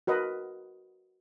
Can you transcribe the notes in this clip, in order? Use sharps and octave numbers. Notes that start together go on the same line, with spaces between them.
F#4 A#4 B4 D#5